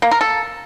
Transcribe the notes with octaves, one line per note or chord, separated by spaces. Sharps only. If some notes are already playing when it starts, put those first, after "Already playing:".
A#3
A#4
A4